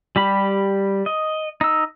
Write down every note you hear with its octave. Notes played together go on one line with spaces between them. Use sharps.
G3 G4 B5
D#5
D#4 E6